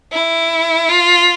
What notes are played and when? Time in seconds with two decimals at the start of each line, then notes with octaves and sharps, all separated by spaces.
0.12 E4
0.89 F4